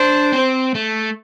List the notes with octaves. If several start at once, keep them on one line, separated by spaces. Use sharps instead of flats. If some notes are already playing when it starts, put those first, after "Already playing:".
Already playing: D4 C5
C4
A3